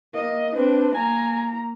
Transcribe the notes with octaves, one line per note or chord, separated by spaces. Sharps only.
A#3 D#5
C4 D4 B4
A#3 G#5 A#5